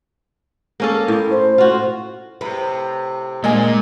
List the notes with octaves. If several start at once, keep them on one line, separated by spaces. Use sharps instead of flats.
A#3 C#4 A4
A2
C5
F4 F#4
A2 C3 B4
A#2 G#3 A#3 D4 D#5 G#5